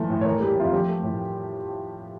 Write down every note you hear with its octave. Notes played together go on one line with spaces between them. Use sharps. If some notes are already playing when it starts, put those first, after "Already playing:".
Already playing: E3 F3 A3 A4
A2
C#5
E3 A#4
G3 A4
G4
F2 F4
F3 G4
A3
A2